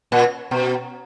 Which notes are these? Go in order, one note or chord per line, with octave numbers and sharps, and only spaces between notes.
A#2
B2